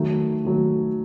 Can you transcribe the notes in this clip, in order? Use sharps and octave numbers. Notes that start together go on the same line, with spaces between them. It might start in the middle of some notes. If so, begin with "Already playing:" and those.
Already playing: D#3 F#3 A3
D#3 F#3 A3